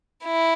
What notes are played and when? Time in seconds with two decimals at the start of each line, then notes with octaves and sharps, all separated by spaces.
0.24 E4